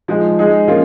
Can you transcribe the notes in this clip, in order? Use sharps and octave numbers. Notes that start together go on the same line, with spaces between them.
F3 G#3 D#4
G#3 D#4 G#4
F3 A#3 C#4 F4